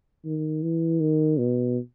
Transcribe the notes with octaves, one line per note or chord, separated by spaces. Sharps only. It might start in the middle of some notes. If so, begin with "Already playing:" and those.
D#3
E3
D#3
B2